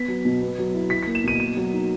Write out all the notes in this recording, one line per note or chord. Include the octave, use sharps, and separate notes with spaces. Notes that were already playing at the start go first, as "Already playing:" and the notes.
Already playing: B3 B6
F#3
B2
B3
F#3
E4
E4 B6
A#3 B6
E7
B2 D#7
A#3 D#7
F#3
D#4